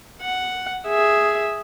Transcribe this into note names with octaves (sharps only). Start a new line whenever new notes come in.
F#5
G#4 E5